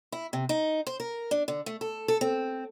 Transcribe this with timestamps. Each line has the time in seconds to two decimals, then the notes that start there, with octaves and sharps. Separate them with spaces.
0.12 E4
0.33 C3
0.49 D#4
0.87 C5
1.00 A#4
1.31 D4
1.48 D3
1.66 A3
1.81 A4
2.08 A4
2.21 C4